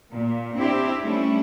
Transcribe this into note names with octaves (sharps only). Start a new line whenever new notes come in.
A#2
C4 D4 E4 G4
G3 A3 C#4 D4 E4